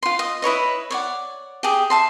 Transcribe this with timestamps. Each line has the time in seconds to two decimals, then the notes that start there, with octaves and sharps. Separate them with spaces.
0.03 F4 C6
0.19 D#5
0.42 E4 B4 C#5 D#5
0.91 C#5 D5 F#5
1.63 G4 G#4
1.90 E5 A5 C6